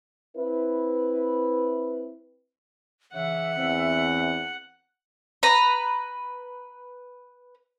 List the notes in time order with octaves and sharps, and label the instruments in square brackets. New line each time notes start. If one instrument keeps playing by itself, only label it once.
[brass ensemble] C4 E4 B4
[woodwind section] C#3 E3 [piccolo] E5 [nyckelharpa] F#5
[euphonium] E2 [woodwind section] C4
[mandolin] B4 A#5